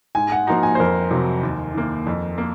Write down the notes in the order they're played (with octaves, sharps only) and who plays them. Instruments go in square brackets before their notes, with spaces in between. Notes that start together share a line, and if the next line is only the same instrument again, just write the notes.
[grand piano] G#2 [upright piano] G#5
[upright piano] F#5
[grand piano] F3 A#3 D#4 F#4 [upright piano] A#5
[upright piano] G#5
C5
[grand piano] F2 [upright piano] A#4
[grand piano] C3 F#3
D#2
D#3 A#3
F2
A#3